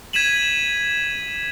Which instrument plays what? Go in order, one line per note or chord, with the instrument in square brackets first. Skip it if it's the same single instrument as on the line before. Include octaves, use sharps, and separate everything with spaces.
[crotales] G#6 B6 D#7 E7 F#7